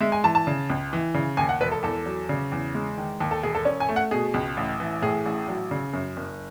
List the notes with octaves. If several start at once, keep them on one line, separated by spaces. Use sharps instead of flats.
G#3 E5
G#5
E3 A5
A5
C#3
C#2
E3
C#3
D#2 G#5
F#5
E1 B4
A4
E2 A4
F#3
C#3
E2
G#3
D#3
D#2
A4
E1 G#4
A4
C#4
G#5
A3
F#5
B2 G#4
C#2
A1
E3
A2 G#4
A1
F#3
C#3
F#2
F#1